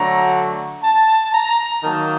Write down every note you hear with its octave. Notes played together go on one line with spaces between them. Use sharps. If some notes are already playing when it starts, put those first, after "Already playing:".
Already playing: D3 F#3 A3 A#5
A5
A#5
D#3 F#3 A#3 A5